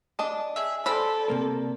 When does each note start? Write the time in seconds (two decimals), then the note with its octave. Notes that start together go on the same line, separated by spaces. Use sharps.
0.19 D4 D#5 A5
0.56 G#4 E5
0.86 A4 C5 D5 B5 E6
1.28 C3 A#3 A#4